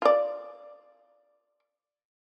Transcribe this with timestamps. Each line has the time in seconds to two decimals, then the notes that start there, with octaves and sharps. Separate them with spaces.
0.02 F4 D5